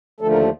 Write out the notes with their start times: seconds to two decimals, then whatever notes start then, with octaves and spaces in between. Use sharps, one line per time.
0.20 D#2 D3 F3 A3 A4
0.31 A#4
0.40 A4